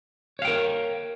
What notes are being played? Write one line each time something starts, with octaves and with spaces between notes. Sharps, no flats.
A#4 C#5 F5 G5